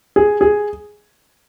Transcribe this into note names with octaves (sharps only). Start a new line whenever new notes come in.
G#4
G#4